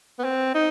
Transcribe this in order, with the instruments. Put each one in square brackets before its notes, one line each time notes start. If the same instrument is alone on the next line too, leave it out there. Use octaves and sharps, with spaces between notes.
[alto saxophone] B3
C4
D#4